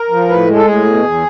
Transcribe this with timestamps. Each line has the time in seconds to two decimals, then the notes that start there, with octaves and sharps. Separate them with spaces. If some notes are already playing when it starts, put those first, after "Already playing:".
Already playing: A#4
0.10 F3
0.28 A2 B4
0.47 G#3
0.55 A4
0.65 A2 G#4
0.84 B2
1.03 E2